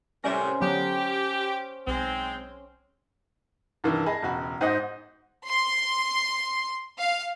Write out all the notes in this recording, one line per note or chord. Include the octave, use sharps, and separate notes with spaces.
A2 C3 G3 C#4 A#4 C5 D5 E5
D3 F#3 B3 G4
B1 G#3 C4
C2 G2 D#3 E3
G#4 D#5 G#5 A5 B5
E1 C#2 F#4 B5
G#2 C5 D#5 F#5 D#6
C6
F5